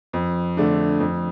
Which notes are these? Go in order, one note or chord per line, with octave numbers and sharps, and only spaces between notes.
F2
D3 A3 D4
F2